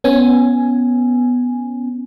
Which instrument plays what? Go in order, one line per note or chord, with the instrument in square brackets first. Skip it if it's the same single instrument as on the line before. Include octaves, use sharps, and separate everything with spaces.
[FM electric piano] B3 C#4 G#5